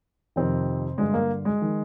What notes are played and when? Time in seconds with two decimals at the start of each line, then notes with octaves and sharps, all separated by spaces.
0.36 F2 C3 D#3 C4
0.98 G2 D3 G#3
1.14 A#3
1.45 G#3
1.62 D#3